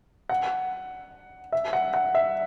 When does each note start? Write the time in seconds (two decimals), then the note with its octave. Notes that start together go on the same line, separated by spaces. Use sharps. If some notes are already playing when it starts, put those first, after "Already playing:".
0.29 F#5
1.52 E5
1.73 F#5
1.94 F#5
2.15 E5